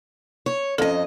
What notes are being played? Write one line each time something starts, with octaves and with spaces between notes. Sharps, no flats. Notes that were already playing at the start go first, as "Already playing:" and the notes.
C#5
F2 C#4 A4 D#5